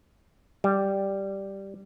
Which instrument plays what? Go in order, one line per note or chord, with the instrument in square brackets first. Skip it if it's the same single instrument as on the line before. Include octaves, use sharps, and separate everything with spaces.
[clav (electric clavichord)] G3